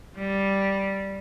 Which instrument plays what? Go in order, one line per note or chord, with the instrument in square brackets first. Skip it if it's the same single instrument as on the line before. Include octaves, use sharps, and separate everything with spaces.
[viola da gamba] G3